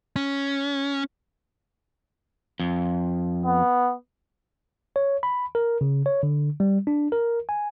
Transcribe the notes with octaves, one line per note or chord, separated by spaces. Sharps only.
C#4
F2
B3
C#5
B5
A#4
C#3
C#5
D3
G3
D4
A#4
G#5